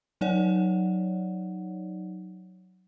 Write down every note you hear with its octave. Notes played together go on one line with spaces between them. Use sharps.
F#3 D#4 C#5 D5 F#5